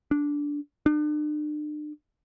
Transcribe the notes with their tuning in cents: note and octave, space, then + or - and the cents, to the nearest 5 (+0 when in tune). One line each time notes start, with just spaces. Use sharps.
D4 -10
D4 +40